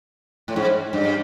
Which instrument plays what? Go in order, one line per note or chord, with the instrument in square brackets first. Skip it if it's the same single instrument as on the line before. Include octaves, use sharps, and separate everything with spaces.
[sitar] A2
G#2
G2